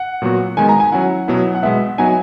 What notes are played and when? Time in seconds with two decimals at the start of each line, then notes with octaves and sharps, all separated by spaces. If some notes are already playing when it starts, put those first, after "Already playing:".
Already playing: F#5
0.22 A#2 F#3 B3 F#4
0.57 D#3 G#3 B3 G#5
0.69 A#5
0.80 G#5
0.92 F#3 C#4 E4 F#5
1.28 B2 F#3 B3 E4
1.55 F#5
1.63 B2 G#3 B3 E5
1.98 F#3 B3 D#4 G#5